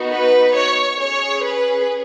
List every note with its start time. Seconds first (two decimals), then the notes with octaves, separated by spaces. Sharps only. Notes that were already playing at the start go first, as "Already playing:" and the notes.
Already playing: B3 D#4 F#4
0.10 B4
0.54 C#5
0.98 C#4 G#4 C#5
1.42 B4